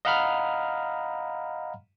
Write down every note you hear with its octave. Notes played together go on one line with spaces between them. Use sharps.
D#5 F5 F#5 A#5 B5 F6